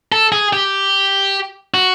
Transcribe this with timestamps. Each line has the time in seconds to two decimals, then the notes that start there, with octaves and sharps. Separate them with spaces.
0.12 A4
0.32 G#4
0.53 G4
1.74 F#4